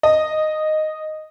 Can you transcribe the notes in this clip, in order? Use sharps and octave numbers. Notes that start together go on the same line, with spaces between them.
D#5